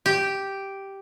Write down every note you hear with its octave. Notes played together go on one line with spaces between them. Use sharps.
G4